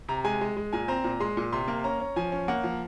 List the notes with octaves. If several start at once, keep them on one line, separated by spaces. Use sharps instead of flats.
C3 A#5
G#3 G#5
G#3
G#3
A#2 G#5
C4 A#5
A#2
G#3 C6
A#2
C3 C6
A#3
C#4 A#5
C#4
F3 G#5
C#4
A#3 F#5
F3